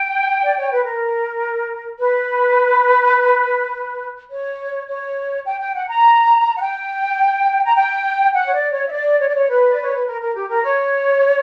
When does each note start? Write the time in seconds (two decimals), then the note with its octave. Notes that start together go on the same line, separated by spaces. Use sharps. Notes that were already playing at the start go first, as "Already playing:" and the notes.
Already playing: G5
0.43 D5
0.57 C#5
0.71 B4
0.85 A#4
2.00 B4
4.30 C#5
4.88 C#5
5.45 G5
5.59 G5
5.74 F#5
5.89 A#5
6.56 F#5
6.61 G5
7.64 A#5
7.76 G5
8.34 F#5
8.46 C#5
8.52 D5
8.72 C#5
8.87 E5
8.91 D5
9.20 C#5
9.28 D5
9.35 C#5
9.49 B4
9.69 D5
9.81 C#5
9.93 B4
10.07 A#4
10.21 A#4
10.35 G4
10.49 A#4
10.64 C#5